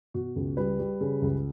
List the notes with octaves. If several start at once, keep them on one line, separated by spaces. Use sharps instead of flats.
B2 F#4
C#2
G3 B4
G3
C#3
C#2